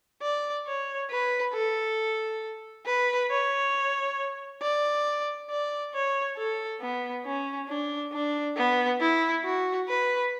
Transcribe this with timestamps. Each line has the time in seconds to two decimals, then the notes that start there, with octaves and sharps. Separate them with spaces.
0.22 D5
0.67 C#5
1.10 B4
1.54 A4
2.86 B4
3.30 C#5
4.62 D5
5.50 D5
5.94 C#5
6.37 A4
6.81 B3
7.25 C#4
7.69 D4
8.13 D4
8.57 B3
9.00 E4
9.44 F#4
9.89 B4